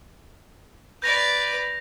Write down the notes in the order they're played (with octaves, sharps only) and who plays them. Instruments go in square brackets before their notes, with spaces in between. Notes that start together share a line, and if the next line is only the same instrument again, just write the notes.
[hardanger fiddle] B4 D5 [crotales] G6 A#6 F7